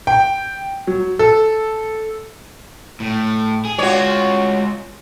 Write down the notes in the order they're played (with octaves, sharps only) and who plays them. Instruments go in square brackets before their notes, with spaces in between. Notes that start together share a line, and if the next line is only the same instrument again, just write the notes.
[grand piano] G5
F#3
A4
[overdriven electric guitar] A2
G#4
[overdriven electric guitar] G#3 F4 [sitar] F#4 C#5